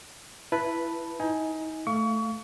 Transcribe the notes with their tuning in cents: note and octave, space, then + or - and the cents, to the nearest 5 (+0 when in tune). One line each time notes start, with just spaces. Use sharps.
E4 +20 B4 +0 A5 +0
D#4 +30 G#5 +0
A3 +0 F5 +0 C#6 +30